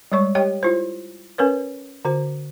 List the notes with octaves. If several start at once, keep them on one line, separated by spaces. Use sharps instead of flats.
G3 G#3 C#5 C#6
G4 C#5 D#5 G5
E4 F4 C5
C#4 A#4 B4 C#5
D3 F#4 C5